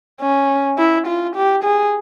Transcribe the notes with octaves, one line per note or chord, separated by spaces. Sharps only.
C#4
E4
F4
G4
G#4